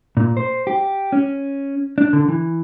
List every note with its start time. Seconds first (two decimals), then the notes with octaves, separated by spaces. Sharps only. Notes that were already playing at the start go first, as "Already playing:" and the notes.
0.17 A#2
0.37 C5
0.67 G4
1.12 C#4
1.98 D4
2.13 D3
2.28 E3